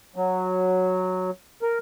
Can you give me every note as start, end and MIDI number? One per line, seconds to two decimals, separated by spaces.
0.16 1.31 54
1.62 1.78 70